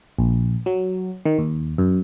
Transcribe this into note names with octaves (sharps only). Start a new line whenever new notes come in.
A#1
F#3
D#3
D#2
F#2